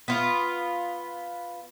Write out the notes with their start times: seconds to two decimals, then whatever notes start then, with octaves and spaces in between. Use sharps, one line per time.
0.08 B3 F4